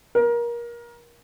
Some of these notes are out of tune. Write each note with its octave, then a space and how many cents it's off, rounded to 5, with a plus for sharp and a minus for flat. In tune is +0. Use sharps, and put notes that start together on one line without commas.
A#4 +25